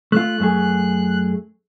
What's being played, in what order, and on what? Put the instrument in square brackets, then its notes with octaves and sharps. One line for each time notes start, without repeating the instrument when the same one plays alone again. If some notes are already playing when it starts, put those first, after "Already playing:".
[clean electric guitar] A3 F4 [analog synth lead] F#6
[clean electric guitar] F#2 A3 G#4